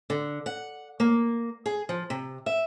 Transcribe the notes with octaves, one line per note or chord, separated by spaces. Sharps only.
D3
F#5
A#3
G#4
F3
C3
E5